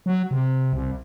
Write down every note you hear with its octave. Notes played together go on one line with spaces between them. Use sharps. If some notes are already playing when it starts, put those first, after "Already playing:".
F#3
C3
C2